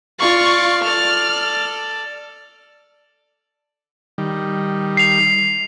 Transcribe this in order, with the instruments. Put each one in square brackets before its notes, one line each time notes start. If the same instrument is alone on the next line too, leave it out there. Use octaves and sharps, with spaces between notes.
[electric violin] F4 C#6 [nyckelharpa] D5 F5
[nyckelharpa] A4 D5 [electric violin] F6
[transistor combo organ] D#3 G3
[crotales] C7 F7